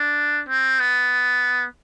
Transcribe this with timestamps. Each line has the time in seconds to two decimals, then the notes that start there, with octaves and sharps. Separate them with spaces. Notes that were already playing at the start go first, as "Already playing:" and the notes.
Already playing: D4
0.48 C4
0.80 B3